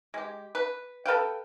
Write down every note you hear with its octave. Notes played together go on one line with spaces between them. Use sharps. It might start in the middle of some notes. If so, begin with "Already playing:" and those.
G#3 G4
B4
A4 B4 F5 G5